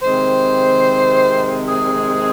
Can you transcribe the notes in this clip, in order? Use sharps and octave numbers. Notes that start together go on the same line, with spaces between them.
C3 D#3 G#3 C4 C5
G#4